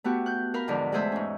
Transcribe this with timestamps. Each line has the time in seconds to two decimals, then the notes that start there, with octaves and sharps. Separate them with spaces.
0.04 A3 B3 F#4 G4
0.26 F#6 G6
0.54 A#4 F5 B5
0.68 E2 G#2 D3 F3
0.92 G#3 A3 G#4 C5 E5
1.12 G#2 C#4